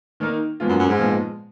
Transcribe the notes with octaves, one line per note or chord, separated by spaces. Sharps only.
D#3 A#3 D#4 A#4
A#2 F3 G#3 B3 F4
F#2
F#2
G#2
A#2 F3 G#3 B3 F4